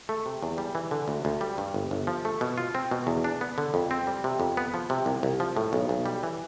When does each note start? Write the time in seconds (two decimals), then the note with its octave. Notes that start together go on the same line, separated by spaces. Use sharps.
0.09 A3
0.26 C3
0.43 E2
0.58 G3
0.75 E3
0.91 D3
1.08 D2
1.25 D2
1.41 G3
1.58 G2
1.74 G1
1.91 G1
2.07 F3
2.25 A3
2.41 B2
2.58 F4
2.75 C4
2.91 B2
3.07 E2
3.24 D4
3.41 B3
3.58 D3
3.74 F2
3.91 C4
4.07 G3
4.24 C3
4.40 F2
4.57 B3
4.74 F3
4.90 C3
5.06 C2
5.23 C2
5.40 F3
5.57 A2
5.73 B1
5.89 B1
6.06 G3
6.23 E3